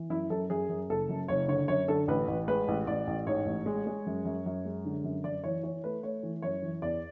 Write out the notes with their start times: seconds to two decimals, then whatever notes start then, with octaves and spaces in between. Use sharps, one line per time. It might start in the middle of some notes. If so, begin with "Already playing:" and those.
Already playing: E3
0.10 F#2 E4
0.30 F#2 A4
0.50 F#2 G#4
0.69 F#2
0.89 F#1 A4
1.09 F#2
1.28 F#1 C#5
1.48 D3 C#5
1.68 F#2 C#5
1.88 D3 A4
2.08 A1 B4
2.28 A1
2.48 G#3 B4
2.68 A1
2.87 A1 D5
3.07 A1
3.27 G#2 C#5
3.46 A1
3.66 G#3
3.87 G#3
4.06 F#2
4.25 F#2
4.46 F#2
4.65 G#3
4.85 D3
5.04 F#2
5.24 F#2 D5
5.44 E3 C#5
5.63 E3 C#5
5.84 A3 B4
6.03 A3 C#5
6.23 E3
6.42 F#2 C#5
6.62 E3
6.82 E2 D5